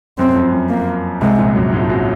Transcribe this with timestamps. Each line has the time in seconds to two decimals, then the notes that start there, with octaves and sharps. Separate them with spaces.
0.18 F#2 C4
0.35 F2
0.52 F#2
0.70 A#3
1.21 C2 C3 G#3
1.38 A#1 A#2
1.55 F#2 F#3
1.73 G#2 G#3
1.81 F3
1.89 F#2 F#3